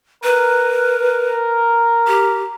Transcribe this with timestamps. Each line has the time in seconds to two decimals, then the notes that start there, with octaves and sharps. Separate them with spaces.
0.24 A#4 B4
2.08 G4